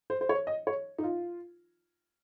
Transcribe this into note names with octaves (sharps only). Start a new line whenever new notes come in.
C5
C5
C#5
D#5
C#5
D#4
F4